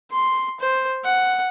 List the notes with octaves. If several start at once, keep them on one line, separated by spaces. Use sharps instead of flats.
C6
C5
F#5